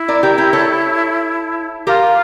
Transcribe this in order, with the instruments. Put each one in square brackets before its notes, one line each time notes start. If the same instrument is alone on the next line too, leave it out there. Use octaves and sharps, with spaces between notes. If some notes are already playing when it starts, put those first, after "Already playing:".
Already playing: [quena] E4
[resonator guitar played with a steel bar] A#4 D5
G4 A#4
G4 A#4
A4 C#5
[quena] F4 [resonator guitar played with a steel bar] G4 A#4